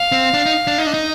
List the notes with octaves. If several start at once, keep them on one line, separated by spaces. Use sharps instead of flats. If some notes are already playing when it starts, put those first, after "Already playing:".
Already playing: F5
C4
D4
D#4
D4
D#4 D#5
D4
D#4